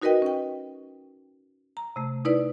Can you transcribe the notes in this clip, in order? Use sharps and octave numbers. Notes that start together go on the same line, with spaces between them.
D#4 F#4 A#4 B4 D#5 G5
C#4 G5
A#5
C3 A3
D#4 E4 B4 D5